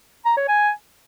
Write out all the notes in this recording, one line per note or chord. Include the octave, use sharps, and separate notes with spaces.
A#5
C#5
G#5